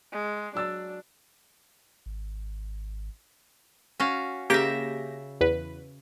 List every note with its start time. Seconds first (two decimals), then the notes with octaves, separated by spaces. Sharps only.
0.12 G#3
0.55 F#3 D4 E6 A6
2.06 G#1
4.00 C#4 F#4 F5
4.50 C#3 A#3 G4 E5 A#6
5.41 E2 B4